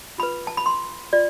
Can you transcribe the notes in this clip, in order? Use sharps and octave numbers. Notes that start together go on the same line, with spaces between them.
F4 B4 B5
A5
B5
C6
F4 D5